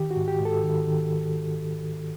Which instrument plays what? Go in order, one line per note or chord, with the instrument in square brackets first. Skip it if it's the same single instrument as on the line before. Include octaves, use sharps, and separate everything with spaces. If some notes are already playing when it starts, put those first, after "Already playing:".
Already playing: [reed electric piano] D#3 G4
F#4
G#2
G4
G#2
A4
D#3
D#3